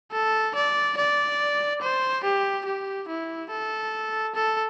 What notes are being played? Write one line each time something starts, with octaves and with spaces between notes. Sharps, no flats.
A4
D5
D5
C5
G4
G4
E4
A4
A4